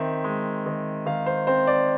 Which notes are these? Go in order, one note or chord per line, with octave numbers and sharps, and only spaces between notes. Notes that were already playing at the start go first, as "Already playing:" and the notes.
Already playing: D#3 C4 E5
G#3
D#3
D#3 F5
C5
C4 C5
D5